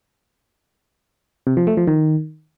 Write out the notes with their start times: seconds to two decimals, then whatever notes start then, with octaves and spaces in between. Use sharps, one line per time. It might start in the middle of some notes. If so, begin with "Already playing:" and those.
1.47 C3
1.57 F3
1.67 A3
1.77 F3
1.87 D#3